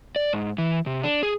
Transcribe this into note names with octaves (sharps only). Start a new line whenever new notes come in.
D5
G#2
E3
C3
D4
G#4